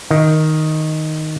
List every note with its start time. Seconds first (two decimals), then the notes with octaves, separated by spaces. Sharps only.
0.11 D#3